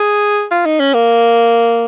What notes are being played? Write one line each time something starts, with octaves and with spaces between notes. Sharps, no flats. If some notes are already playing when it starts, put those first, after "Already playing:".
Already playing: G#4
F4
D#4
C#4
A#3